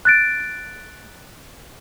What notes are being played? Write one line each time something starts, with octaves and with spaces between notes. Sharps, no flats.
F#6 A6 D7